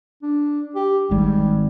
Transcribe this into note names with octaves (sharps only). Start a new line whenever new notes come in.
D4
G4
G#1 G#2 G3